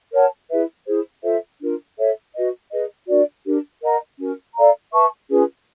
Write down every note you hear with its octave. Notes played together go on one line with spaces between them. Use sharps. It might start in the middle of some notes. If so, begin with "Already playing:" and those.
A#4 C#5 F#5 A5
E4 G#4 B4 E5
E4 G#4 C5
F4 A4 C5 E5
D4 F4 A#4
A4 C#5 E5
F#4 B4 D#5
G#4 B4 D#5
D4 F#4 A#4 D5
D4 G4 A#4
A#4 D#5 F#5 A#5
C#4 F#4 A#4
A4 D5 F5 A#5
B4 E5 A5 C#6
C#4 F4 G#4 B4